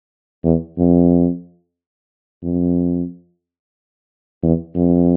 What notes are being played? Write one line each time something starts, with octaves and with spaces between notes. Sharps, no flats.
E2
F2
F2
E2
F2